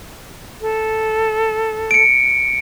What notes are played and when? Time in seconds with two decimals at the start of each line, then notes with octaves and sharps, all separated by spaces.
0.60 A4
1.91 C#7 D7